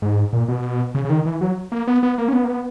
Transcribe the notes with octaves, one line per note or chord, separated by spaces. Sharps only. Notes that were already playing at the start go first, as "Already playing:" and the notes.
G#2
A#2
B2
C#3
C#3
D#3
E3
F#3
A#3
B3
B3
A#3
C#4
B3
A#3
B3